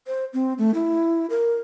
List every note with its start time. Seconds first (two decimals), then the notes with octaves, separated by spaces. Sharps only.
0.07 C5
0.33 C4
0.58 A3
0.74 E4
1.30 A#4